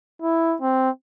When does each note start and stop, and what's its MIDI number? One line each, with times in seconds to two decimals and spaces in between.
0.22 0.56 64
0.62 0.90 60